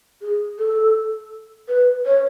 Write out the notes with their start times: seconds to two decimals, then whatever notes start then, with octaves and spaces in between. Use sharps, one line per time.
0.22 G#4
0.59 A4
1.69 B4
2.06 C#5